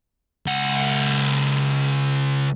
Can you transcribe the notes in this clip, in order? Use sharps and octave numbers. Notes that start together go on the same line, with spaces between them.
C#2 F#5